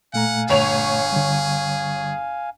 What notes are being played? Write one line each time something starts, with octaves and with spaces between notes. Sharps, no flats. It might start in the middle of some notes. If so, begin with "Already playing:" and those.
A#2 A3 F5 F#5 G#5 A#5
G1 G#4 C#5 F7
D3 G3